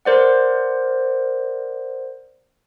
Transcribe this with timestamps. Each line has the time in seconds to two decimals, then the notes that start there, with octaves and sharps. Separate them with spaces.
0.05 A#4 C5 D5 F#5